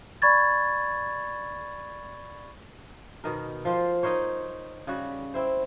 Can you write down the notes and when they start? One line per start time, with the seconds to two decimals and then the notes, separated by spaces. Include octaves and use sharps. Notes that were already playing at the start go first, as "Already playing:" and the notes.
0.22 D5 B5 C#6 G#6 A6
3.24 B2 D#3 A#4
3.65 F3 F4 C5
4.03 D#4 A#4 C5 C#5
4.87 C#3 G3 F#4
5.34 C4 E4 C5